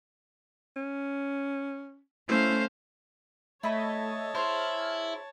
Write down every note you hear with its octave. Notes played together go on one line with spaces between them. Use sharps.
C#4
A3 C#4 E4 C5 F5
A3 E4 C#5 D#5 E5 A5 B5
E4 G#4 C5 F6